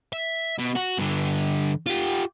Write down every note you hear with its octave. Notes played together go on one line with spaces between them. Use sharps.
E5
B2
F#4
G2 D3
F4 G4